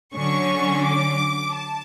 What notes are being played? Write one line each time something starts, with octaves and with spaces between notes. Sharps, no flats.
D3 F#3 C#4 C#6
D6
A5